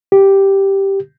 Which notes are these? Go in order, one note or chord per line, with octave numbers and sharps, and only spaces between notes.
G4